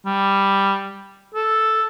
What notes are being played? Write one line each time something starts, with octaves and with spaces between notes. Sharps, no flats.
G3
A4